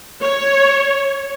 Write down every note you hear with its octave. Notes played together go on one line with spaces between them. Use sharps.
C#5